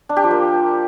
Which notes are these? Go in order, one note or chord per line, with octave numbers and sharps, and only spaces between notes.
D4
G4
F3
A#3